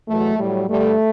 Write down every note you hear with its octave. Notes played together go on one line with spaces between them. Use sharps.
E2 B2 F#3 A3
A2 F#3 G3
G2 D3 G3 A3